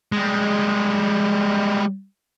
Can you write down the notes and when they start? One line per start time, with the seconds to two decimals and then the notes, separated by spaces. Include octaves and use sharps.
0.12 G3 G#3